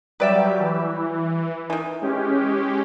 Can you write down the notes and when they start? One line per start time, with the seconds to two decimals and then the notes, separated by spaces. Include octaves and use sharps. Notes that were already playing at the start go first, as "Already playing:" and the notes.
0.20 F#3 G3 G4 B4 D5 E5
0.59 E3
1.70 D#3 E3
2.02 G#3 C#4 G4